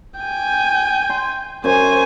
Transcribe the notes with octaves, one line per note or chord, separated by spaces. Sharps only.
G5 G#5
C6
F#2 C#4 C5 G#5